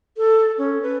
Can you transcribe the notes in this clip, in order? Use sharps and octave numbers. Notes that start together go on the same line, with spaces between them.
A4
C#4
B4